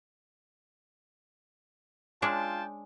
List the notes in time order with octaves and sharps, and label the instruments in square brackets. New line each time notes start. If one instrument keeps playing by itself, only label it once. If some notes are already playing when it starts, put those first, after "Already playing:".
[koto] G#3 C#4 D4 [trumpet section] F4 G5 A5